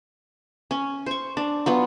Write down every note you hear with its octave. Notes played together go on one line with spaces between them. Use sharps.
C#4
C5 C#6
D4
F#3 B3 F4